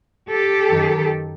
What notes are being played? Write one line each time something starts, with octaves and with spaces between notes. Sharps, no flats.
G4 A4
F#2 D#3